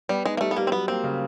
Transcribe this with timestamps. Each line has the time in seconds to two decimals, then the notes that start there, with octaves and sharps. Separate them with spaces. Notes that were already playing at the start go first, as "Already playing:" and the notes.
0.09 G3 B3
0.25 G#3 D#4
0.37 A#3
0.41 G3 A3
0.51 B3
0.56 G3 A#3
0.67 C4
0.72 F#3 B3
0.88 A#3 C4
1.04 C#3